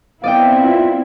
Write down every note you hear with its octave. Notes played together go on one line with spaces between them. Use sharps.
B3 C4 E4 D5 D#5 F5 G5
F4